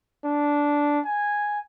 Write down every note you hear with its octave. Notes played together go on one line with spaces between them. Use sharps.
D4
G#5